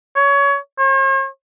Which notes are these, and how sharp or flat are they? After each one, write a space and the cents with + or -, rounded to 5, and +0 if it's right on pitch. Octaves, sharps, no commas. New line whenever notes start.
C#5 +25
C#5 -45